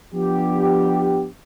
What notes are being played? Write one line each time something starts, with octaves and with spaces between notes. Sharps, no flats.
F3 B3 D4 G4